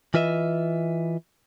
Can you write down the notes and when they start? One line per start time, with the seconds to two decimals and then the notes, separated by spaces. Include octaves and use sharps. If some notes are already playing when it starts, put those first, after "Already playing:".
0.14 E3 F4 B4 D#5 E5